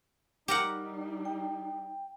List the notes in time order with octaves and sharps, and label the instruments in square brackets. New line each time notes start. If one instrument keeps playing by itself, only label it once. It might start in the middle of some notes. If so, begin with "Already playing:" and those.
[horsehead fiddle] G3 D#4 [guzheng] G4 A#4 F#5
[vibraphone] G5